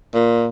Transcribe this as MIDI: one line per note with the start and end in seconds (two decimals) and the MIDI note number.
0.14 0.46 46